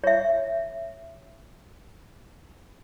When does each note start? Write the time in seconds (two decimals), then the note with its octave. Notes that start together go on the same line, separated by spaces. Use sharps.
0.04 C#5 E5